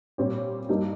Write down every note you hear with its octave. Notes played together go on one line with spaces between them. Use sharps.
A#2 G3 C4 G4 C#5
G2 G3 A#3 D#4